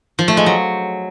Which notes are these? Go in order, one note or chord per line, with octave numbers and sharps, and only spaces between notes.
F3
A3
G#3
F#3